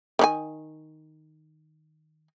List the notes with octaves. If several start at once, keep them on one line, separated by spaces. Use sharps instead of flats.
D#3 D4 G#5